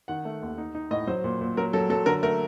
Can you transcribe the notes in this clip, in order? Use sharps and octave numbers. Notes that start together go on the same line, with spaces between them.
D#3 F#5
A3
D#2
D#4
D#4
A2 D#5
F#3 C5
A#2
A#2
F#3 A#4
F#3 A4
F#3 A4
D3 A#4
A3 A#4